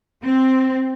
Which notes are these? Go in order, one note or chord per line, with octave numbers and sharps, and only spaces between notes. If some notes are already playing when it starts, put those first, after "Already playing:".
C4